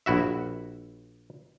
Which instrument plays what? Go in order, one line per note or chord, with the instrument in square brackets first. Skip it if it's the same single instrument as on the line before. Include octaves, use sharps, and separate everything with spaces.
[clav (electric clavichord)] A#1 E4 F#4 E5